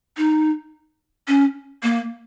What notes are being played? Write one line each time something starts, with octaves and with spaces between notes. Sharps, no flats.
D#4
C#4
A#3